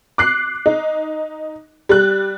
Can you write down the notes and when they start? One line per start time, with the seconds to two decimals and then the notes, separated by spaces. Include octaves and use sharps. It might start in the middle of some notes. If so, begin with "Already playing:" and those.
0.18 D6 F#6 C7
0.66 D#4
1.89 G3 F#6